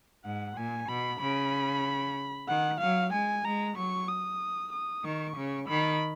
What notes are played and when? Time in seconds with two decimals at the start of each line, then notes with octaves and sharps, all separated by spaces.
0.24 G#2 F#5
0.57 A#2 G#5
0.89 B2 B5
1.20 C#3 B5
2.48 D#3 F#5
2.80 F#3 F5
3.13 G#3 G#5
3.45 G#3 A#5
3.77 F#3 C#6
4.09 D#6
4.72 D#6
5.04 D#3 C#6
5.37 C#3
5.68 D#3 B5